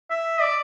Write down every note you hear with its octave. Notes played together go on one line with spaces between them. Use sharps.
E5
D5